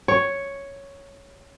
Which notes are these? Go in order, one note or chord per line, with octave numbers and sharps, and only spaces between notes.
C#5